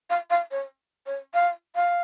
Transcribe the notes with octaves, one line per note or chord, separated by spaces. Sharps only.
F5
F5
C#5
C#5
F5
F5